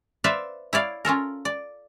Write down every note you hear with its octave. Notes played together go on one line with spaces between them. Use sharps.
B4 C5 D5 E5 F5
E4 C#5 D5 F5
C#4 F4 A4 A#4
D5